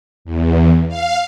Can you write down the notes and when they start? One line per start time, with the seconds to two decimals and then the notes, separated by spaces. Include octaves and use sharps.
0.25 E2
0.88 F5